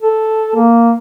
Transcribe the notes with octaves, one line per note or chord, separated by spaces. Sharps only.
A4
A#3